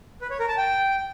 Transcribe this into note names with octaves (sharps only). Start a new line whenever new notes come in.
B4
C#5
A#4
A5
G5